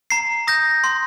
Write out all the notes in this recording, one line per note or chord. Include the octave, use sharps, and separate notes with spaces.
A#5 C7
D#6 G6 A#6
C6